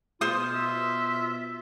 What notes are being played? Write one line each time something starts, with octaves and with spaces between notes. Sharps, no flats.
B2 F4 C5 D#6
E5